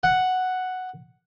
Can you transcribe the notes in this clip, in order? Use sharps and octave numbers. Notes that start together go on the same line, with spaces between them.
F#5